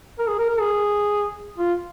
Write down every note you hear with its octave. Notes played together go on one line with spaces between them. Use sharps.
A#4
G#4
A#4
A#4
G#4
F4